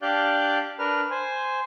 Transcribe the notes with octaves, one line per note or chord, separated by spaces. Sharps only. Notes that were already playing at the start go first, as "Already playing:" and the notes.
D4 G4 D5 F5 F#6 G6
D4 A#4 B4 F6
C5 G#5